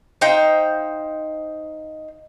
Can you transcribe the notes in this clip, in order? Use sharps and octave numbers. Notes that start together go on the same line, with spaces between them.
D#4 C5 F5 G5